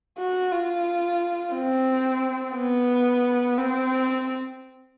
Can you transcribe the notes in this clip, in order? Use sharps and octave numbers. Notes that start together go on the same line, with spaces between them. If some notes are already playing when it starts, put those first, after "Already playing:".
F#4
F4
C4
B3
C4